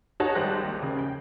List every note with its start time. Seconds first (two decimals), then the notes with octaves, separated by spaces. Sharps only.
0.20 D#4 F#4 G#4 C#5 D#5 A5
0.35 G#1 G3 G4 C5 F#6 A#6
0.63 D#2
0.83 C#3
0.99 G5